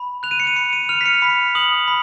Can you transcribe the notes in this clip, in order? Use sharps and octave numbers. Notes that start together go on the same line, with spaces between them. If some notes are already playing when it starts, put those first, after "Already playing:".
Already playing: B5
F#6 F7
D#7
C#7
D#7
B5 C#7
D#7
F6 F7
B6
C#7
B5
D#6 F#7
B5